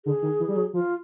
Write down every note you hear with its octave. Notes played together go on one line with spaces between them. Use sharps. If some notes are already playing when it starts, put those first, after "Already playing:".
D3 G#4
D#3
E3
G3
F#3
F3 F4